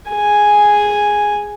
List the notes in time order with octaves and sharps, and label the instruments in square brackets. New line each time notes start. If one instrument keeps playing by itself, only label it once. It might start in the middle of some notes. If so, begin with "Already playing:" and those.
[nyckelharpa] G#4 G#5